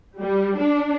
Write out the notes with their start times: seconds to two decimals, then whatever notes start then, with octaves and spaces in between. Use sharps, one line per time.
0.18 G3
0.59 D4